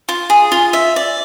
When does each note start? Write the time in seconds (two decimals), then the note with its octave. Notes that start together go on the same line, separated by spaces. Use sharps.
0.09 F4
0.30 G#4
0.52 F4
0.73 E5
0.96 D5